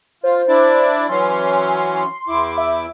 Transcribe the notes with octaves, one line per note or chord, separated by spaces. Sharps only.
F4 C5
D4 E4 D5
E3 F#3 C#4 C6
E2 E4 D6
E5